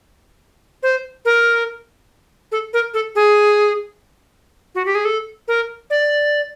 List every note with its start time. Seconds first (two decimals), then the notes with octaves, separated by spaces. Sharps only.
0.83 C5
1.25 A#4
2.52 A4
2.73 A#4
2.94 A4
3.15 G#4
4.75 F#4
4.86 G4
4.95 G#4
5.05 A4
5.48 A#4
5.90 D5